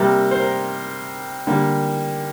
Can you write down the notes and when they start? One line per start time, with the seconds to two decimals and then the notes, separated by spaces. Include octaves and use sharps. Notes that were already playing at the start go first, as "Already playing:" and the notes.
Already playing: C3 G3 A#3 G4
0.31 C5
0.41 A#4
1.47 D3 G3 A#3